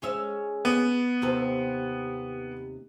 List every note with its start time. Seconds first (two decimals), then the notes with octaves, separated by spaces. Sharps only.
0.02 G#3 C#4 E5
0.65 B3
1.22 D#2 C3 B4